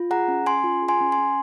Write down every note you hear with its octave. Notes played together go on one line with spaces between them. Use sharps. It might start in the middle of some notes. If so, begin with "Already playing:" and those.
Already playing: F4
G#4 F#5 A#5
C#4
C#4 G#5 C6
F4
G#4
G#5 C6
C#4
G#5 C6
C#4